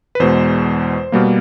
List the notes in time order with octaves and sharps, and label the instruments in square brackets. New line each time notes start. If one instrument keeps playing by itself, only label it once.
[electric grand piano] B4
E2 B2 G#3 C5
B2 G3 A#3